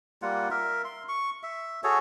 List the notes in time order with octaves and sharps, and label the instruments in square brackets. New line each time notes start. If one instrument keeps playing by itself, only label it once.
[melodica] G3 A#3 F4 F#5
A#4 E5
C6
C#6
E5
F#4 G#4 A4 C#5